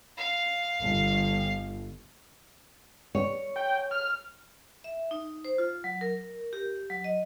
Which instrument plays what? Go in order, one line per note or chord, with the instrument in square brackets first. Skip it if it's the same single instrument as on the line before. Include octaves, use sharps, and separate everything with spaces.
[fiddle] F5
[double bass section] G1
[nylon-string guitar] C#5
[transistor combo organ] G5
F6
[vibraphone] E5
D#4
C5
F4
F#3
A#4
G4
F#3
D#5